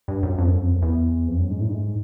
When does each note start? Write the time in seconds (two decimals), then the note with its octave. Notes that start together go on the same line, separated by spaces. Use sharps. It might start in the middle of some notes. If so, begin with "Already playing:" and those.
0.08 G2
0.23 F#2
0.38 F2
0.49 F#2
0.61 F2
0.82 E2
1.28 F2
1.39 F#2
1.51 G#2
1.61 A2
1.68 G2
1.72 G#2